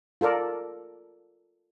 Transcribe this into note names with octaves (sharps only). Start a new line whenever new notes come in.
F4 A4 A#4 D5